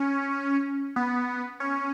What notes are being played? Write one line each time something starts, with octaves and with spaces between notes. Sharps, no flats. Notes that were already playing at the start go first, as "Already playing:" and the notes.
Already playing: C#4
B3
C#4